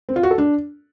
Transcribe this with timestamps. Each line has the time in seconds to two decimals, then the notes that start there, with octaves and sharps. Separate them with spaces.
0.09 C4
0.16 F4
0.23 F#4
0.31 A4
0.38 D4